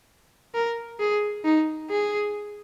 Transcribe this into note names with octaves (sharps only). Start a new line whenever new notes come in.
A#4
G#4
D#4
G#4